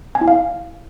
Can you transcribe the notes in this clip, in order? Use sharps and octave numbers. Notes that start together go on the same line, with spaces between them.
G#5
E4
F5